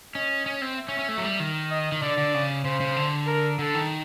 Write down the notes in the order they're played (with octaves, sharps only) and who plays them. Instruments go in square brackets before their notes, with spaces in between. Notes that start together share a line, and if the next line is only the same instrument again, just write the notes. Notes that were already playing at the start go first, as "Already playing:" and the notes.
[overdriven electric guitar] C#4 [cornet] D#5
[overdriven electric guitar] C#4
C4
[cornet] E5
[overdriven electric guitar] C#4
C#4
A3
F#3
G3
D#3
[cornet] D#5
[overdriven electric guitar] D#3
[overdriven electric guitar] D3 [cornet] D5
[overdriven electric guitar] D3
C#3
[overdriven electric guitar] C#3 [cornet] C5
[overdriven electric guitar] C#3
D3
[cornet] A#4
[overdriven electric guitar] D3 [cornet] A4
[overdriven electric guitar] D#3